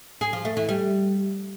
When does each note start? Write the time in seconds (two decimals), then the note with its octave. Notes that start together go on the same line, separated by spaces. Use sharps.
0.21 G#4
0.33 F3
0.45 A3
0.57 E3
0.69 G3